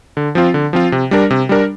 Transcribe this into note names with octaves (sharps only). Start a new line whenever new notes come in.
D3
F3 C4 F4
D3
F3 C4 F4
C3
G3 D4 A#4
C3
G3 D4 A#4